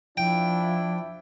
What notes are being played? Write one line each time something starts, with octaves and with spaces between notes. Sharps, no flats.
F3 D4 E4 G5